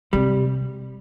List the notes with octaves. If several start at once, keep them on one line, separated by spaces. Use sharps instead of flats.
C3 G3